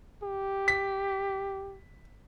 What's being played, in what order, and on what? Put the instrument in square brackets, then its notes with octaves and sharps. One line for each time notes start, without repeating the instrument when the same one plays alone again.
[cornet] G4
[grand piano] B6